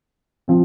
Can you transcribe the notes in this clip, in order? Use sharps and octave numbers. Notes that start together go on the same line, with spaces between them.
F3 C4